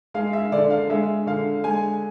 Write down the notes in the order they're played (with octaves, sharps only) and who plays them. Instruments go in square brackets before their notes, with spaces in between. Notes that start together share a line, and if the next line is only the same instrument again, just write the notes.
[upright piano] G#3 F5
E5
D3 D5
F5
G#3 E5
D3 F5
G#3 G#5